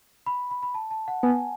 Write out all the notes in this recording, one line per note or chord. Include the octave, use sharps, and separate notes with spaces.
B5
B5
B5
A5
A5
F#5
B3 G#5